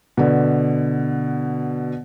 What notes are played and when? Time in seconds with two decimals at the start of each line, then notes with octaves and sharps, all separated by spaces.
0.17 B2 D3